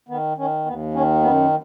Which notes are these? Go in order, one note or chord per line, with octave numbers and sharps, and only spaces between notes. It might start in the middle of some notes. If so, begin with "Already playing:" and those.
D#3 B3
D#3 C#4
D#2 B3
D#3 C#4
F#2 B3